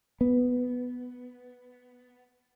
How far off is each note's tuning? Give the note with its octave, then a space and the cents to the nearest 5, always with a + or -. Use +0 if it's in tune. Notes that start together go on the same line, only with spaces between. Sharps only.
B3 +5